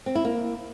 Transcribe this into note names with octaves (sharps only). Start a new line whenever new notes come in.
C4
E4
A#3